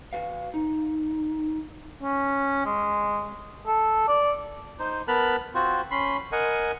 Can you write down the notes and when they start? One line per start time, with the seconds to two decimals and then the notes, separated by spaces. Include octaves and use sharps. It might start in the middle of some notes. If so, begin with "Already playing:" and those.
0.13 F#4 B4 F5
0.54 D#4
2.03 C#4
2.66 G#3
3.67 A4
4.08 D5
4.79 D#4 C5
5.08 B3 A#4 A5 B5 F6 F#6
5.55 C4 F4 F#4 C5
5.91 C#4 B5 C6
6.32 A#4 D#5 F#5 G#5